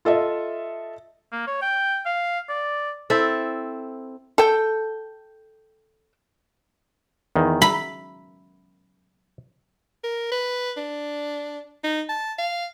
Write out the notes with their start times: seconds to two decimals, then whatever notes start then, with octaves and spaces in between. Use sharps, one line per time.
0.05 F4 A4 D#5 E5
1.32 A#3
1.47 C#5
1.62 G5
2.06 F5
2.49 D5
3.10 C4 E4 A4 E5
4.38 A4 G5
7.36 E2 D#3
7.62 E5 B5
10.04 A#4
10.32 B4
10.77 D4
11.84 D#4
12.09 A5
12.39 F5